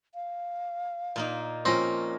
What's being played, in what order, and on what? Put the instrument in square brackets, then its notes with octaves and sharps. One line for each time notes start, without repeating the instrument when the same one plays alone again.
[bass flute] F5
[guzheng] A#2 A#3 D#4
[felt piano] A#2 F3 A#6 [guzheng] A#3 C#4 [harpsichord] C4